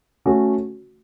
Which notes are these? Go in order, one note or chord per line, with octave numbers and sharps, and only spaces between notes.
A3 C#4 F#4